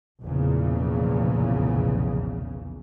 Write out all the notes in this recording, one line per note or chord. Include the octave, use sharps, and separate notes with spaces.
F1 B1 E2 A#2 C#3